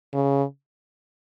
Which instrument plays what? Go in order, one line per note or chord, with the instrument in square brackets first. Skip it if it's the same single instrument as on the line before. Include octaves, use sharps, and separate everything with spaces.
[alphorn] C#3